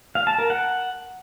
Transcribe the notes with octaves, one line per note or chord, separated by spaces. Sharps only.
F5
A5
A#4
F#5